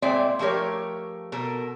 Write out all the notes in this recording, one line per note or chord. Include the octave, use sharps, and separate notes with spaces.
A#2 G#3 C4 D5 E5
F3 A3 G4 A#4 C#5
B2 A4 A#4